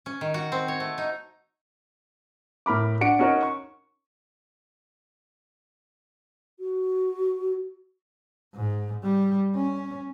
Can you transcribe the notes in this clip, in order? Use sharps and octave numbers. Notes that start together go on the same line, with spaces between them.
C#4
D#3
F#4
C4
C#5
A3
D#4
A2 A#4 B5 D6
D4 F#4 D5 F#5 C#7 D7
C#4 D#4 F#4 A#4 C#5 D#5
C#6
F#4
G#2
G3
C#4